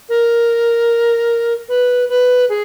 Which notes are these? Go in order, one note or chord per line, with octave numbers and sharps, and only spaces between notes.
A#4
B4
B4
G#4